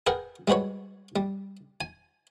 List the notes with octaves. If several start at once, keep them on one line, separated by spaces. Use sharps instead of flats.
G#4 A#4 B4 F#5 G5
G3 G#3 F#4 B4 C#5
G3
G#5